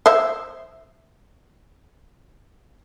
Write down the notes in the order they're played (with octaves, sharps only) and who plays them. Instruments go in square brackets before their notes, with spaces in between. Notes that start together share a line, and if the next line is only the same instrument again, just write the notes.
[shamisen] C5 E5